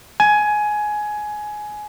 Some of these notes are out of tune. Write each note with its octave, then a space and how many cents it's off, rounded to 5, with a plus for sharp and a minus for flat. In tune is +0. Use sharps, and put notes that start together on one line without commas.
G#5 +15